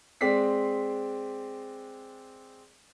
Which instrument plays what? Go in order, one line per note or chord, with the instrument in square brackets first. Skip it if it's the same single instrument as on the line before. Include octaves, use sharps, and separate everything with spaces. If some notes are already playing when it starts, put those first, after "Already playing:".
[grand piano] G#3 C4 D5 B6 C7